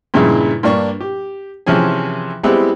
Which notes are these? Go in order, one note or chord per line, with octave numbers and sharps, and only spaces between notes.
G2 A#2 C#3 G#3 E4
G2 A#3 D4 C#6
G4
C3 E3 F3 C#4 G#4
G3 G#3 B3 C4 E4 G4